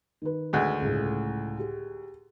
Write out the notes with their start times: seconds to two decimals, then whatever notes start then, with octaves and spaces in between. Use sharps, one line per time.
0.22 D#3 B4
0.53 D2 G#3
0.81 C#2 A2
1.59 G4 G#4